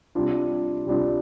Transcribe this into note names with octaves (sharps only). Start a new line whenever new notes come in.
C3 G3 D4 F4
C3 G3 D4 F4